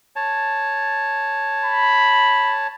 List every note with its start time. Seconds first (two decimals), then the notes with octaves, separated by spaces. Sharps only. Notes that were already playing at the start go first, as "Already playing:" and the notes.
0.16 C#5 A5
1.64 B5